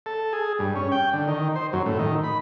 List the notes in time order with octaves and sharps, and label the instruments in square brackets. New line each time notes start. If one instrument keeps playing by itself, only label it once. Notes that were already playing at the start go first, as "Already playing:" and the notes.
[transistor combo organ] A4
G#4
G2
C#4
G5
D3
D#3
C5
F#2
A2
D#3
B5